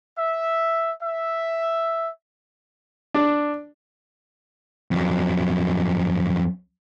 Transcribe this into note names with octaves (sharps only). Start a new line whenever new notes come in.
E5
E5
D4
F2 F#3